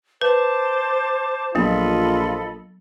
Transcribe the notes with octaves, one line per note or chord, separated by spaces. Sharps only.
B4 C5 A5 D6
A#1 F#3 B3 F4 A4 D#5 B5